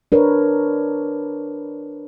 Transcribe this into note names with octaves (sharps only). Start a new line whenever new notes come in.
D4 A#4 B4 C#5